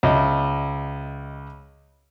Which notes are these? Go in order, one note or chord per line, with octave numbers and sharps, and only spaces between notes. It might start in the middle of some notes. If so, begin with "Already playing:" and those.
C#2 D#5 E5